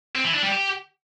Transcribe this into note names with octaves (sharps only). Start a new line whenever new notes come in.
C4
E3
D4
G3
G4